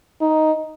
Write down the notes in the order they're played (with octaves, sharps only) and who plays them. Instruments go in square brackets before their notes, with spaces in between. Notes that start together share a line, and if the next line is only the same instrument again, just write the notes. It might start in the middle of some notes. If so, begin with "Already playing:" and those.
[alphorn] D#4